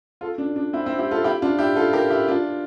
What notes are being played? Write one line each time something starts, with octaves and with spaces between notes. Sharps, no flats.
F4 A4
D4
D4
C4 E4
C4 E4
E4 G4
F4 A4
E4 G4
D4 F4
E4 G4
F4 A4
G4 A#4
E4 G4
D4 F4